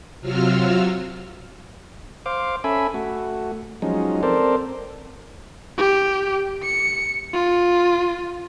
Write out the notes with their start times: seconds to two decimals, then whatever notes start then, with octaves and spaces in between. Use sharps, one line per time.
0.21 C3 F#3 F4 F#4 E6 F6
2.26 C5 F5 D6
2.64 C#4 A4 E5 G#5 B5
2.94 A3 F#4
3.82 F3 F#3 G#3 C#4 D#4
4.23 C4 A4 A#4 C5 D5
5.78 G4
6.63 C#7
7.34 F4